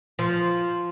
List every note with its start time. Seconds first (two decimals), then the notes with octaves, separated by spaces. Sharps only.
0.19 F3